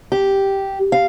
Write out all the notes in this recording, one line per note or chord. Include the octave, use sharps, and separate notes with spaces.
G4
F5